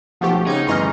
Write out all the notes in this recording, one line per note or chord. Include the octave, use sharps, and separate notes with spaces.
B1 F3 A3 G4 F#5 C#6
C#3 D#4 G#6 D#7
D2 G2 E3 D#5 A#5 C6 C#6 F6